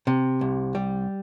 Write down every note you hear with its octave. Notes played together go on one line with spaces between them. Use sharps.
C3
C2
G3